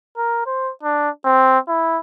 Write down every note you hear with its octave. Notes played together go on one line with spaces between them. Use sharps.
A#4
C5
D4
C4
E4